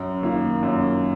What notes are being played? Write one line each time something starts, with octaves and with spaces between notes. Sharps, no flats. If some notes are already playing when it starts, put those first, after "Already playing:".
Already playing: F#2
D#3 A#3 F4
F#2